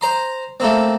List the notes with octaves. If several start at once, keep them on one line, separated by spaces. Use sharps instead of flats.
C5 A#5 C6
A3 A#3 C4